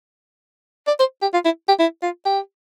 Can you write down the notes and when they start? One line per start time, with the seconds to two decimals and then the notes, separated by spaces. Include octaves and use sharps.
0.87 D5
0.99 C5
1.22 G4
1.33 F4
1.45 E4
1.68 G4
1.79 E4
2.03 F4
2.25 G4